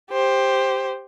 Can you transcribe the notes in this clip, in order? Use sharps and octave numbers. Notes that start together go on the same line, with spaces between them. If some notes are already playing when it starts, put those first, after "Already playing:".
G4 C5